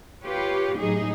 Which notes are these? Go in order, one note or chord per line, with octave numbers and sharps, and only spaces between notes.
F4 G4 B4 C#5
A2 F#3 D#4 G#4